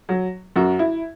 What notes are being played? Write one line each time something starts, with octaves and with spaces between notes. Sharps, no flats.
F#3
F#2 F#4
E4